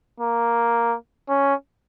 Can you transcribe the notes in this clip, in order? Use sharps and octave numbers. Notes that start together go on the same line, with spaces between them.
A#3
C#4